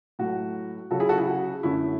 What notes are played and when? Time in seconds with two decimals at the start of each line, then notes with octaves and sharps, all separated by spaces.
0.19 A2 F#3 A3 F#4
0.91 C#3 F#3 C#4 F#4 A4
1.00 E4 G#4
1.09 F#4 A4
1.18 E4 G#4
1.27 F#4
1.63 F#2 D3 A3 C#4 E4